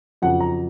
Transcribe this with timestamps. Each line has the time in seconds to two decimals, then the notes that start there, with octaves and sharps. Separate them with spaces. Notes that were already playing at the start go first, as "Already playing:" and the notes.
0.22 F2 C#3 F#3 F#5
0.40 A#5